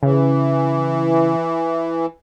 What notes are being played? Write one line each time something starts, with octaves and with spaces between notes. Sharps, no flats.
C#3 E3